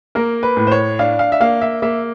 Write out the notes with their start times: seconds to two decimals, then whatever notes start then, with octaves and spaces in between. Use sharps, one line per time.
0.15 A#3 A#4
0.43 B4
0.57 A2
0.67 C5
0.72 C#5
0.99 D4 F5
1.19 F5
1.32 E5
1.40 A#3 F5
1.62 E5
1.82 A#3 E5